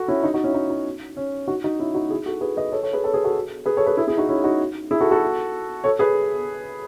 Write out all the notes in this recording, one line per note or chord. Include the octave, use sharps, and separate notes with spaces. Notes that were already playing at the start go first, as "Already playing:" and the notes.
Already playing: F#4 A4
C#4 E4
D#4
D#4 F#4
C#4 E4
D#4
D#4
C#4
D#4 F#4
D#4 F#4
C#4 E4
D#4 F#4
E4 G#4
F#4 A4
G#4 B4
B4 D#5
A4 C#5
A4 C#5
G#4 B4
A4 C#5
G#4 B4
F#4 A4
G#4 B4
A4 C#5
G#4 B4
E4 G#4
E4 G#4
D#4 F#4
C#4 E4
D#4 F#4
E4 G#4
F#4 A4
F#4 A4
A4 C#5
G#4 B4